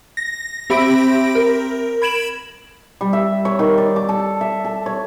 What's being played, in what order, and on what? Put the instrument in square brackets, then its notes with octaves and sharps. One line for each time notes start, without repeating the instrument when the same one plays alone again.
[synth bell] A#6
C4 G4 E5 B5 A#6 D7
A#4
B5 G#6 D7 E7 F#7
[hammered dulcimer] G3
E5
C#5
D#3
D5
D6
A4
E5
A4
C#5